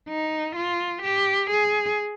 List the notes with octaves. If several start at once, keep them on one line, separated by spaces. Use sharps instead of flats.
D#4
F4
G4
G#4